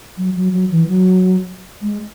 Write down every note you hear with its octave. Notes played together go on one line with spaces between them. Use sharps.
F#3
F#3
F#3
E3
F#3
G#3